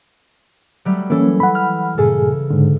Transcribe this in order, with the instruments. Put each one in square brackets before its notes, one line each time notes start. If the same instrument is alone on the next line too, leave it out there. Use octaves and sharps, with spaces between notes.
[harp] F#3 G3 A3
[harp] E3 A4 [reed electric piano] A#3 C#4
[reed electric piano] F#5 B5
[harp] F6
[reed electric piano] G2 A#2 G#4 [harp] C#3 A4
[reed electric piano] G#2 D3